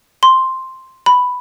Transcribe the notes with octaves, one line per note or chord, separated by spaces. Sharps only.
C6
B5